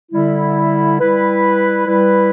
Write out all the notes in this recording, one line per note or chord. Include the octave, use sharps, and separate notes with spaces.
D3 G3 E4
G3 E4 B4
G3 E4 B4